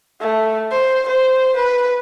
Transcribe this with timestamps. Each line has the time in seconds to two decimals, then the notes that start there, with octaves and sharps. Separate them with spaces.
0.21 A3
0.71 C5
1.08 C5
1.56 B4